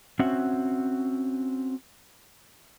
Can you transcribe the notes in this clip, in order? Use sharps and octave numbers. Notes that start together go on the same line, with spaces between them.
C4 C#4 F#4 E5 F#5